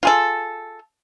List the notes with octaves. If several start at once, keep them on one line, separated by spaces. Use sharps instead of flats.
F4 G#4 A4